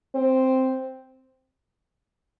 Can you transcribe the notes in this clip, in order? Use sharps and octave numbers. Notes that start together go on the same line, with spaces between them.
C4